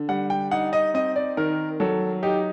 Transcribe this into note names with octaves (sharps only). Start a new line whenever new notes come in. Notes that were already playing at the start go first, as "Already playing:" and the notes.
Already playing: D3
G3 F#5
G5
D#4 F#5
D#5
C4 D#5
D5
D#3 A#4
F#3 A4
D#4 G4